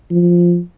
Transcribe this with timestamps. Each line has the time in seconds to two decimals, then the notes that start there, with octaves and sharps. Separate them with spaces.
0.11 F3